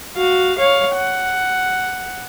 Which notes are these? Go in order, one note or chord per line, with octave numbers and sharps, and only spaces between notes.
F#4 F5
C#5 F5
F#5